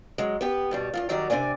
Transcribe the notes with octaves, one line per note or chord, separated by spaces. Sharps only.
F#3 G#3
B3 G4 B4
G2 B2 G3
E2 G2 F4
D#3 F#3 G3 F#4 A#4 D5
C3 C4 D4 D5 G#5